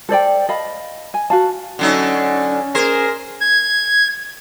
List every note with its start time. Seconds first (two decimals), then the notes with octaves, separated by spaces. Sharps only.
0.09 A4 C5 D5 G5
0.49 D#5 F5 A5 B5
1.14 G#5
1.30 F#4 F5 A5
1.79 D3 F#3 C#4 D#4
2.75 G#4 A#4 C5
3.40 G#6